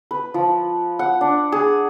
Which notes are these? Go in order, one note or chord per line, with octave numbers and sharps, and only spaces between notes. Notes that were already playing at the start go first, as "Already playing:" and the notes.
B4
F3
F#5
D4
G#4